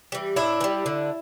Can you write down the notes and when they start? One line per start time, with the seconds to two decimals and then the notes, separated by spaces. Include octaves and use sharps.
0.12 E3 G3
0.36 A2 D4 E4
0.61 E3
0.64 G3
0.86 D3